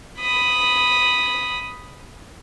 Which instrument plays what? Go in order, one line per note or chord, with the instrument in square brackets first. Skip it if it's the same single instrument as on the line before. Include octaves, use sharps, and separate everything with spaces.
[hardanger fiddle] B5 D#6